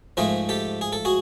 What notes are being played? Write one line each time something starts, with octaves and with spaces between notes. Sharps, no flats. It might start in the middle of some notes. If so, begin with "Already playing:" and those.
G#2 F3 A3 G#4 A#4
G4 A4
G#4
A4
F#4 G#4